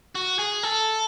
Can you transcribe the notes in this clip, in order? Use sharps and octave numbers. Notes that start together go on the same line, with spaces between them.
F#4
G#4
A4